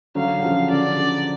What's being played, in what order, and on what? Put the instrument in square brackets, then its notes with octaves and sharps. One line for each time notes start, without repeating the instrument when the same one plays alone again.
[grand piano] D3 F#3 [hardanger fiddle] F5
[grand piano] F#3
C#3 F3
[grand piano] D3 [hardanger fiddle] D5
[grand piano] C#3